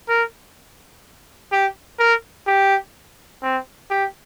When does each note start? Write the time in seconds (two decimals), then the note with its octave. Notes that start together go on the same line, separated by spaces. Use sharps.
0.08 A#4
1.52 G4
1.99 A#4
2.47 G4
3.43 C4
3.90 G4